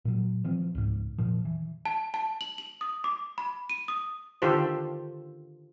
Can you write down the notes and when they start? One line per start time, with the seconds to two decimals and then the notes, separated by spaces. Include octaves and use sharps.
0.05 A#2 F#3
0.44 E3 F3 C4
0.75 C#2 G#2
1.18 F1 A#2 F3
1.45 E3
1.85 A5
2.14 A5
2.41 F#7
2.58 F#7
2.81 D#6
3.04 D6
3.38 B5
3.70 D#7
3.88 D#6
4.42 D3 D#3 F4 G4 A4 C5